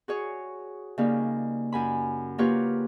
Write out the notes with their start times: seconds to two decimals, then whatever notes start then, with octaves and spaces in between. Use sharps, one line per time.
0.08 F#4 G#4 C#5
0.98 C#3 G3 A#3 D#4
1.72 F#2 G#5 B5
2.38 F#3 A#3 F4 G4 B4 C#5